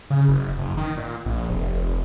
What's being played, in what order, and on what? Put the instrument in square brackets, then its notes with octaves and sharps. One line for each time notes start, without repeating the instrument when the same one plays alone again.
[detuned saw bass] C#3
F#1
F#1
D#3
A#2
A#1
F1